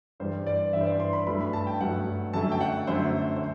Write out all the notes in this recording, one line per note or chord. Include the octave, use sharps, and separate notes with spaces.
G2 E3 G3 C5
D5
G2 E3 G3 E5
C5
D5
C6
B5
G2 F#3 A3 B5
B5
A5
G5
G2 F#3 A3 F#5
F#2 D3 F#3 A3 A5
G5
F#5
F#2 D3 F#3 A3 C5
C5